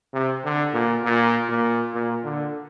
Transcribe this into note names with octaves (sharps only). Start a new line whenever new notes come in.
C3
D3
A#2
A#2
A#2
A#2
D3